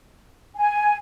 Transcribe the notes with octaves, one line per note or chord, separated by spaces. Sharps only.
G#5